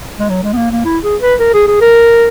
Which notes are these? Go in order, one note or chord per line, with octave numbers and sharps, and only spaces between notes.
G#3
F#3
G#3
B3
A#3
A#3
E4
G#4
B4
A#4
G#4
G#4
A#4